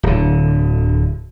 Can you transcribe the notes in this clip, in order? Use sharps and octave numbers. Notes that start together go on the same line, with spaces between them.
D1 D3